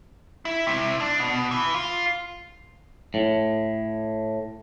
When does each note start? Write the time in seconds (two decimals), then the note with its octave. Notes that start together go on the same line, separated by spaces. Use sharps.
0.45 E4
0.67 C3 E4
1.00 D4
1.20 B2
1.51 E3
1.74 F4
3.14 A2